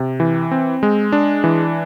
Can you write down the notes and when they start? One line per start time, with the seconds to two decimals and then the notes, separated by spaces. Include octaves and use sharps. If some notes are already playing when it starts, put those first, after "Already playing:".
Already playing: C3
0.20 E3
0.51 C4
0.83 G#3
1.12 D4
1.44 E3